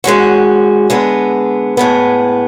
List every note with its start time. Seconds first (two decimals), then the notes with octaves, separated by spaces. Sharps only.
0.04 G#2 G#3 C#4 F#4
0.90 D3 G#3 B3
1.77 A2 G#3 B3